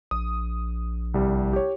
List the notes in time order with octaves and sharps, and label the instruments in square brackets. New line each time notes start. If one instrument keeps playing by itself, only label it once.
[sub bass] A#1 [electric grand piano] D#6
[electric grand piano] C2 G3
G4 C#5